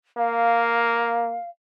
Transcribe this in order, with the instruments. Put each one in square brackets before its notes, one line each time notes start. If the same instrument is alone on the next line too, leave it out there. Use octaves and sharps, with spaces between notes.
[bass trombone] A#3 [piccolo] F5